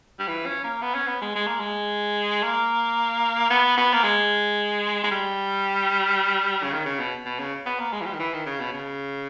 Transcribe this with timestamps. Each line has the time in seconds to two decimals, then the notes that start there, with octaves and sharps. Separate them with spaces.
0.19 G3
0.28 E3
0.46 C#4
0.64 A#3
0.82 B3
0.95 C#4
1.08 B3
1.22 G#3
1.36 G#3
1.47 A#3
1.60 G#3
2.44 A#3
3.50 B3
3.77 B3
3.93 A#3
4.04 G#3
5.04 G#3
5.11 G3
6.63 C#3
6.72 D#3
6.86 C#3
6.99 B2
7.26 B2
7.39 C#3
7.66 B3
7.80 A#3
7.93 G#3
8.01 E3
8.06 G3
8.13 D#3
8.19 E3
8.34 D#3
8.46 C#3
8.61 B2
8.73 C#3